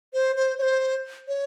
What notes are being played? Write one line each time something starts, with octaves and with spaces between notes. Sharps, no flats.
C5
C5
C#5
C5
C#5